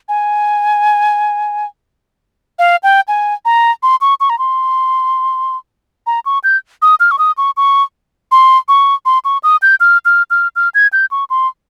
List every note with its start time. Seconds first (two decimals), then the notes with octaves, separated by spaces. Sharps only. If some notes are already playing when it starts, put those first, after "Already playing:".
0.09 G#5
2.59 F5
2.83 G5
3.08 G#5
3.45 A#5
3.83 C6
4.01 C#6
4.20 C#6
4.30 A#5
4.39 C6
6.07 A#5
6.26 C#6
6.44 G6
6.82 D#6
7.00 F6
7.11 C#6
7.19 D#6
7.38 C#6
7.57 C#6
8.32 C6
8.68 C#6
9.06 C6
9.25 C#6
9.43 D#6
9.62 G6
9.80 F6
10.05 F6
10.30 F6
10.56 F6
10.74 G#6
10.93 G6
11.11 C#6
11.30 C6